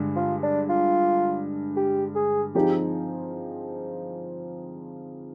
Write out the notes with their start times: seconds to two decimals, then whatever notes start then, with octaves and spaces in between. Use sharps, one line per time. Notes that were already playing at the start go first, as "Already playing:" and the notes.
Already playing: G2 D3 G#3
0.16 F4
0.43 D4
0.69 F4
1.76 G4
2.15 G#4
2.55 F3 C4 D#4 G4 G#4